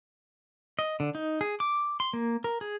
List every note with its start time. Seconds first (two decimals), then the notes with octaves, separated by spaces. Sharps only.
0.79 D#5
1.00 D3
1.15 D#4
1.41 G#4
1.60 D6
2.00 C6
2.13 A#3
2.44 A#4
2.61 G#4